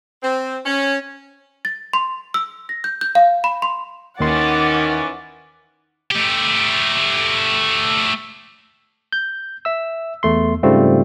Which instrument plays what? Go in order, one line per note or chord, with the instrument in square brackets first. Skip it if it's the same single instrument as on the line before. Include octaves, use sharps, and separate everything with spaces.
[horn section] C4
C#4
[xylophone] A6
C6
E6
A#6
G6
G6
F5
B5
C6
[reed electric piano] D#2 C6 [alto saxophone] D#3 [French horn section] E3 C#4 [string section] F#5 D6 A6
[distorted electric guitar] A3 G4
[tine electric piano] G6
E5 E6
E2 A3 C6
G#2 C#3 G3 A3 C4 F4